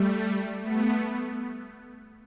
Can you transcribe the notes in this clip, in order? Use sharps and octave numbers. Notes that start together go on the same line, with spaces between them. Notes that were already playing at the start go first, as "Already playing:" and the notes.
Already playing: G3 A3
A3 B3